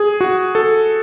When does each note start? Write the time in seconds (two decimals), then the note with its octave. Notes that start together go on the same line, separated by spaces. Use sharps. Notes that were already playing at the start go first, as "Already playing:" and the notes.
Already playing: G#4
0.21 F#4
0.55 A4